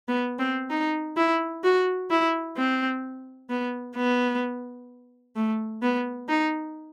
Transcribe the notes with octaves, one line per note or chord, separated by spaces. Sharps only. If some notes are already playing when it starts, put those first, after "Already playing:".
B3
C4
D#4
E4
F#4
E4
C4
B3
B3
A3
B3
D#4